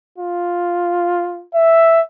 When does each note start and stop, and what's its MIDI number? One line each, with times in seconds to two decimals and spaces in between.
0.18 1.45 65
1.54 2.01 76